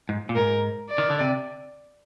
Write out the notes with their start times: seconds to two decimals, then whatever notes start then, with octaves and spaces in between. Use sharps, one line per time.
0.09 G#2
0.29 A#2
0.35 G#2 A#4
0.90 D5
0.98 D#3
1.10 D3
1.20 C3